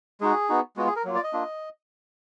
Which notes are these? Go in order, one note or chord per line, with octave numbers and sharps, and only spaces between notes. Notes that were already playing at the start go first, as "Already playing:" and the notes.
G#3 D#4 F#4 G#4
B3 D#4 F#4
G#3 B3 F4 F#4
G#4
A#4
F#3 A#3 F4
D5
D#5
A#3 D4 F4